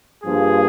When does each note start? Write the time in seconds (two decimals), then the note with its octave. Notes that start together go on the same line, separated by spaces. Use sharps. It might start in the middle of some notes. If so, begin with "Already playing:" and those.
0.23 G2 F3 A#3 G#4